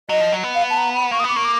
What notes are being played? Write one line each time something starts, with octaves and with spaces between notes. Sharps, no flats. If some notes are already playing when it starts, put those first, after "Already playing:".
F#3 D#5
F3
F#3
B3
F5
A5
A#5
B5
A#3 C#6
D#6
B3 D6
A#3 C#6
D6